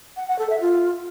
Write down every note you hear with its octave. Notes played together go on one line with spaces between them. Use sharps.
F#5
F#5
A4
E5
F4